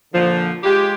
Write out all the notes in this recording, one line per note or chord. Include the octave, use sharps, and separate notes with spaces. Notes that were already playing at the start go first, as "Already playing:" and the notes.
A#2 D3 F3
G#3 F4 G4